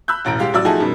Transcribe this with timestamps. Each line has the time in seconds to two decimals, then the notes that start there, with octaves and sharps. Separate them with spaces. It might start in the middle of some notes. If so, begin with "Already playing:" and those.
0.08 B5 E6 F#6 G6
0.25 E1 A1 A#5 D7
0.39 G#3 G4 F5
0.53 A1 F#3 D5 E6
0.65 F3 A3 D#4 F#4 G#4 A4
0.80 F#2 B2 D#3 G3